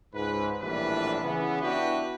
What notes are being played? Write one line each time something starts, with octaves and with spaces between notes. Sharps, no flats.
C#2 G#2 B4
A#1 A2 E3 G3 D4 B4
C#3 E3 B3
B3 D4 E4 F#4 G4 B4